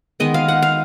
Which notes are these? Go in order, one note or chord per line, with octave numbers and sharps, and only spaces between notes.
D#3 G#3 B3 D#5
F5
F#5
F5